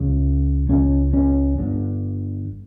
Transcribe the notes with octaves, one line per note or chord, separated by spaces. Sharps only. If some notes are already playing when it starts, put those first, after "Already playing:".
Already playing: C#2 C#3
C#2 C#3 C#4
C#4
G1 G2 D3